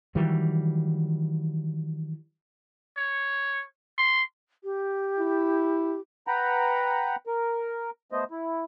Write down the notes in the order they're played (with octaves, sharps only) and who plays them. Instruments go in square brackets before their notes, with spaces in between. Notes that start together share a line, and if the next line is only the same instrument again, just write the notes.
[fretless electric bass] D#3 E3 F#3 G3
[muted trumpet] C#5
C6
[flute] G4
[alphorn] E4
[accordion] B4 F#5 G5 A#5 B5
A#4
A3 B3 C5 D#5
E4